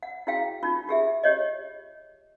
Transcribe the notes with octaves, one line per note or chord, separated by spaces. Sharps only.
F#5
E4 F#4 G#4 F5 G5
D#4 F4
F4 G4 G#4 E5
G4 C#5 D#5